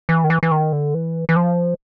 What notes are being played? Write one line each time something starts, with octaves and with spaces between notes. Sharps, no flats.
E3
D#3
E3
E3
D#3
D3
E3
E3
F3